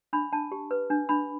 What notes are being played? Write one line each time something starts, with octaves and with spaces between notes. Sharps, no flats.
D4 B5
D4 A5
G4
B4
D4
D4 B5